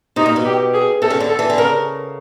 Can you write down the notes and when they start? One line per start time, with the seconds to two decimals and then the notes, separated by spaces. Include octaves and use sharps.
0.16 C3 D#4
0.26 A#2
0.36 B2
0.45 G4
0.73 G#4
1.02 C3 A4
1.10 C#3
1.20 D3
1.29 A4
1.39 E3
1.50 D3
1.58 C#3 A#4